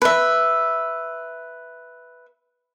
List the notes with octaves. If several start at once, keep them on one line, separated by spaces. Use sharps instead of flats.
B4 E5